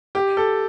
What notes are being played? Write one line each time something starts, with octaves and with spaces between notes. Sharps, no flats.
G4
A4